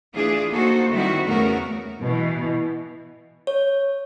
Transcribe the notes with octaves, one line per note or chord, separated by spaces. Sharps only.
E3 A3 D4 F4 G#4
A#3 D#4 F#4 A4 C5
D#3 G3 C4 E4 F#4
E2 C#3 A3 B3 F#4 A#4
B2 E3
C#5